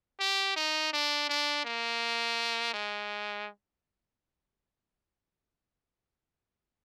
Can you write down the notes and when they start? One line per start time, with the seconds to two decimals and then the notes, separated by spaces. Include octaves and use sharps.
0.20 G4
0.56 D#4
0.93 D4
1.29 D4
1.65 A#3
2.74 G#3